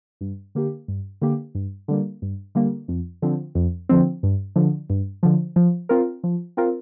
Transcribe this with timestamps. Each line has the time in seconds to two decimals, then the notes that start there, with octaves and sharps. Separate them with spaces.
0.21 G2
0.55 D3 A#3 G4
0.88 G2
1.22 D3 A#3 G4
1.55 G2
1.88 D3 G3 A#3
2.22 G2
2.55 D3 G3 A#3
2.88 F2
3.22 D3 F3 C4
3.55 F2
3.89 D3 F3 C4
4.23 G2
4.56 D3 F3
4.90 G2
5.23 D3 F3
5.56 F3
5.89 C4 F4 A#4
6.24 F3
6.57 C4 F4 A#4